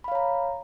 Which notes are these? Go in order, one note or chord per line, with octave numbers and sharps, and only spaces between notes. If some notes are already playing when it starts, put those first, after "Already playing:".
C#5 F5 A#5 B5